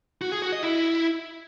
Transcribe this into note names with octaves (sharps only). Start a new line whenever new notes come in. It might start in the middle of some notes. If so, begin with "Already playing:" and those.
F#4
G#4
F#4
D#5
E4